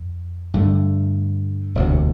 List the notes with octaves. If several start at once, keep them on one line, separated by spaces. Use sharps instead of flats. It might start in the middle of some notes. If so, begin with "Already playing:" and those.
Already playing: F2
G2 D3 A3
E1 D2 C3